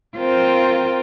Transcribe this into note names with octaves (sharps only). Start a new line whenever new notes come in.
C4 F4 A#4 C5 G5